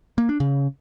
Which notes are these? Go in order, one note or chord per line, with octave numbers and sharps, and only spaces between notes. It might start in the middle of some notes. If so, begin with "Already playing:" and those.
A#3
D4
C#3